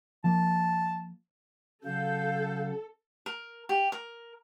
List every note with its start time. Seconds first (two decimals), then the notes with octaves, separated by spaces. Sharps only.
0.24 F3 A#3 A5
1.84 C#3 F#3 A4 F5 G6
3.26 A#4
3.69 G4
3.92 A#4